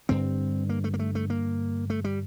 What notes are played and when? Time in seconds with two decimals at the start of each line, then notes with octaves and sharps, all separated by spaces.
0.09 G2 D3 C4
0.69 A#3
0.84 A3
0.94 A#3
0.99 A3
1.15 A3
1.30 A#3
1.90 A3
2.04 G3